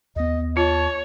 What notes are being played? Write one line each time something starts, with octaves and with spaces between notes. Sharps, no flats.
D#2 B3 D#5
F4 C#5 A5